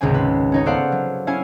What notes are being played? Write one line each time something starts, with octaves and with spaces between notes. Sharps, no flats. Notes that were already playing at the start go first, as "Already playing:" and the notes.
G#1 C#2 C3 C4 G#5
B4
C#4 D#4 C#5
B3 A4 C5 D5 F5 F#5
F#3
C#4 E4 F5 G#5